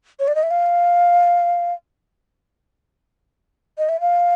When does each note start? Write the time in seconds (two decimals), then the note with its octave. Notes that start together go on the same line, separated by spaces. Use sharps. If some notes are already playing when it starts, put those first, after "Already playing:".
0.19 C#5
0.28 D5
0.35 D#5
0.43 E5
0.51 F5
3.78 D#5
3.89 E5
4.01 F5